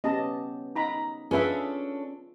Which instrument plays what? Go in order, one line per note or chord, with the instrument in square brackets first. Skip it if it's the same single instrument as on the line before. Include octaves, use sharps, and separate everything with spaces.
[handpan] B3 C#4 G4 [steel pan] D#5 A5
[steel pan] D#4 A#5 B5
[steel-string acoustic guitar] C#4 D4 A4 [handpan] F4 [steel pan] G#4 B4 E5